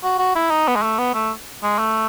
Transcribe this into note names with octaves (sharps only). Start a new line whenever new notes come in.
F#4
F#4
E4
D#4
B3
G#3
A3
B3
A3
G#3
A3